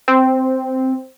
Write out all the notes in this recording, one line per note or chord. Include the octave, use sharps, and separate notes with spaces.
C4